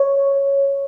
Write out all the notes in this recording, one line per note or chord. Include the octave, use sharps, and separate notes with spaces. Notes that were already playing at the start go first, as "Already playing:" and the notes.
Already playing: C#5